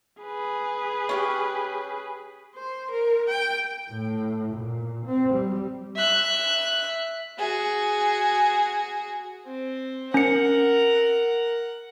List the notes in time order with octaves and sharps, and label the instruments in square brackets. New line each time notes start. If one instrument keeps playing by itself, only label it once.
[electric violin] G#4 B4
[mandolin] C#4 F4 G4
[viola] C5
A#4
G5
[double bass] A2
A#2
C4
G3
[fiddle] E5 F#6
F#4 G#4
[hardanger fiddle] C4
[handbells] C#4 C#7 [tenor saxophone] A#4 [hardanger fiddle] F#5